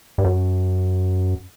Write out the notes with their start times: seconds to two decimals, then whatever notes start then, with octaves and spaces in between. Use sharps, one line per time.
0.18 G2
0.24 F#2